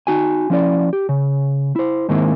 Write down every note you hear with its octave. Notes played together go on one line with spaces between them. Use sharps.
D#4 F#4 G#5
F3 C#4 E4 D5
G4
C#3
E4 C5
G#2 D#3 G#3 A#3 C4 E4